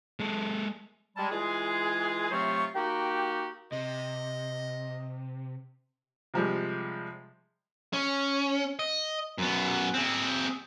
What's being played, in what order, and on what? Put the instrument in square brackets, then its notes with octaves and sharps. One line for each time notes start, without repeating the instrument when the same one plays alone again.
[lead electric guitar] G#3 A4
[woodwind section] G3 G#3 A5
E3 G#3 F4 G#4
C3 F#3 A3 F4 C5 C#6
A#3 D#4 F#4 G4
[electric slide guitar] C3 [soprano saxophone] D#5
[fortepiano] C3 F3 G3 G#3
[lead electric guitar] C#4
D#5
F#2 B3
C4 G#4